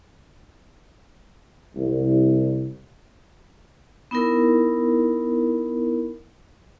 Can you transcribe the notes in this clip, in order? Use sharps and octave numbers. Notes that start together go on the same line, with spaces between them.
C2
B3 D#4 E4 A#4